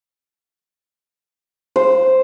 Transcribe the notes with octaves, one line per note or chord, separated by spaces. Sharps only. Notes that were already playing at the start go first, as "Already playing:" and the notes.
C5